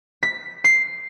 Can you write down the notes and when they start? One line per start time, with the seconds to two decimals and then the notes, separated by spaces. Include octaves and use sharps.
0.23 B6
0.64 C7